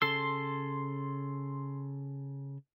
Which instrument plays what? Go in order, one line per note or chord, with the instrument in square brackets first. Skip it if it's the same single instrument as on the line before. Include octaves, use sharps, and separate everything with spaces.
[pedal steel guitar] C#3 A4 E6 [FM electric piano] C6